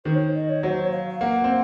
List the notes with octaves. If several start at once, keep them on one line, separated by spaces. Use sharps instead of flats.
D#3 C5
C#5
D#5
C#5
F#3 C5
C#5
F5
F5
A#3 F#5
C4